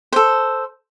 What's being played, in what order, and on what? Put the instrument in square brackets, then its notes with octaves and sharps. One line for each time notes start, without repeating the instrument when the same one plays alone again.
[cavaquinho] A4 C5